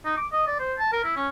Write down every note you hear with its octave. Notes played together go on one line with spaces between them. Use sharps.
D#4
D6
D#5
D5
C5
A5
A#4
E4
C#4